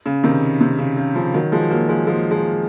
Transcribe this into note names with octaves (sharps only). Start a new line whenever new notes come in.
C#3
C3 D#3
C3
C#3
C#3
C#3 F3
D#3 F#3
F3 G#3
F#3 A#3
F3 G#3
F3 G#3
F3 G#3